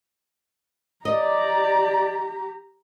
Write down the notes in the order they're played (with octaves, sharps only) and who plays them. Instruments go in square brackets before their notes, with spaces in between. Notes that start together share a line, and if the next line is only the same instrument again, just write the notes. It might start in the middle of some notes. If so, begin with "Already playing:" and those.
[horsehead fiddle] G4 A#5 [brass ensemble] D5 [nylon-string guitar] D#5